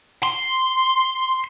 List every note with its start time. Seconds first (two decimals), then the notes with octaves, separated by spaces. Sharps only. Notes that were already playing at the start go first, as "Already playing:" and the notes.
0.23 C6